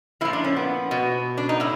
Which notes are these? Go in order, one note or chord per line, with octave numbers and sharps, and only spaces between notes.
A#2 F3 E4
D4
C#4
B3
B2
D4
D#4
A2 E4